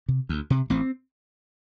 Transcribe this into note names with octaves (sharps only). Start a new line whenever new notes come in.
C3
D2
C3
A1 C4